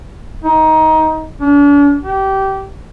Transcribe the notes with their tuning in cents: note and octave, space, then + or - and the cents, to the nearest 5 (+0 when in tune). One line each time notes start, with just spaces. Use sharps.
D#4 +20
D4 -45
G4 -20